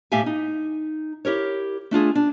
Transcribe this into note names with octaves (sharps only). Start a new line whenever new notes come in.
A2 G4 E5 F5 G#5
D#4
E4 G4 A#4 C#5
A3 D4 F4 G#4
D4